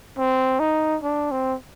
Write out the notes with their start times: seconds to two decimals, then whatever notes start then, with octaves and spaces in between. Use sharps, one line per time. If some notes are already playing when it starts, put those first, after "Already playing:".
0.18 C4
0.60 D#4
1.03 D4
1.32 C4